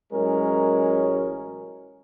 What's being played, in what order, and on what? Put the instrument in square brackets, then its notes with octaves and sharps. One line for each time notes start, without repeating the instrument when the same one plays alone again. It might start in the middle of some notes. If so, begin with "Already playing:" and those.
[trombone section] A1 E3 F#3 G#3 C#4 A#4